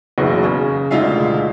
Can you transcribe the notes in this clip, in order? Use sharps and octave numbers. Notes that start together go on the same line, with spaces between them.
F#1 B1 E2 B2
C#3
E1 D2 D#4 F4 E5 F5